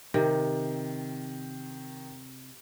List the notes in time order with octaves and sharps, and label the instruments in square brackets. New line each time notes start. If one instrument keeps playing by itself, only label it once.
[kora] C3 [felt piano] D#3